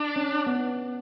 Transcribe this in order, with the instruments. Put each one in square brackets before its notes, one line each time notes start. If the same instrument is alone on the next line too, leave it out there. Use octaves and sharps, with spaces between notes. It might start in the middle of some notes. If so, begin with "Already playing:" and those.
Already playing: [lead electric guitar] D4
[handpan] C#4
B3